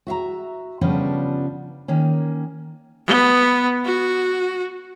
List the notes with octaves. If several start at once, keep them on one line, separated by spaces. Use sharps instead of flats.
F#4 E5 F5 A#5
C#3 F3 G3 B3 C#4 D4
D#3 A#3 C#4
B3
F#4